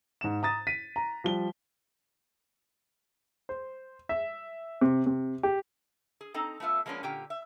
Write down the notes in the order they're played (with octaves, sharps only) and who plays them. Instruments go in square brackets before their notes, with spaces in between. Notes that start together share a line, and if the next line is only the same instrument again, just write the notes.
[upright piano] G#2 E7
A#5 D#6 A6
B6 D#7
A#5
F3 G3 G7
[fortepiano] C5
E5
C3
C3
G4
[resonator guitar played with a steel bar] G#4
C4 D#4 A4 A#5
A3 B3 F4 E5
F3 G#3 A#3 B3 C#4 D4
A#2 D3 C#4 G4 G5
E5